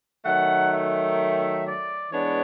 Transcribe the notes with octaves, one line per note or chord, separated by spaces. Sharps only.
D#3 F#3 A3 F#5
E5
D5
E3 G#3 B3 D4 C#5